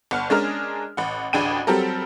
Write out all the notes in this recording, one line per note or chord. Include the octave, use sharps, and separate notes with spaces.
G1 F#5 F6
G#3 C#4 D4 G#4 A#4 F6
A1 F#5
A1 D2 D4 G#4 G5 D#7
F#3 G3 C4 G4 A4 A#4